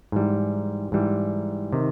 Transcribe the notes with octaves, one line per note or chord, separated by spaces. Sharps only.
G#2 E3 G3
G#2 E3 G3
C3 D#3